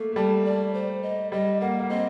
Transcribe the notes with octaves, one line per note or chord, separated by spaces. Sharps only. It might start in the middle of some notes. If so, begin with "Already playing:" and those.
Already playing: A3 A#3
A3
G3 A5
D5
C5
D#5
G3 D#5
A#3 F#5
A#3
C4 D#5